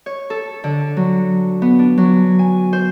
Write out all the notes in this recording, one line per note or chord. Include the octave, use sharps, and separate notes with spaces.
C#5
A4
D3
F#3
B3
D4
F#3
G#5
C5